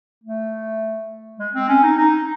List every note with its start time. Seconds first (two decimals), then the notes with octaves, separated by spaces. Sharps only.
0.24 A3
1.39 G#3
1.54 C4
1.69 C#4
1.83 D#4
1.97 D#4